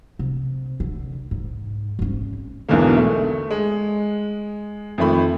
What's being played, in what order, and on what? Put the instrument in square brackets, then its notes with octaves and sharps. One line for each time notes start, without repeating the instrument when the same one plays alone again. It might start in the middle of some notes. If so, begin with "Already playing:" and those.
[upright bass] C3
D3
G#2
G#1 C#4
[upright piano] B1 E2 G#2 B2 D3 A#3
A3
G#3
F2 D#3 A3 B5